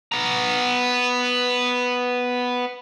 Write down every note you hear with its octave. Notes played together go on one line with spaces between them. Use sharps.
B3 A#5